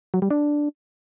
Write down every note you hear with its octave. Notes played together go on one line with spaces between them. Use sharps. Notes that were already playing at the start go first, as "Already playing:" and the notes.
F#3
G3
D4